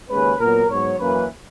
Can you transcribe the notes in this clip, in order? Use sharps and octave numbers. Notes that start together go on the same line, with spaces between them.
D#2 C#3 G#3 C#4 B4
A#2 F#3 B3 A#4
G#2 F#3 B3 C#5
F#2 E3 A#3 C#4 B4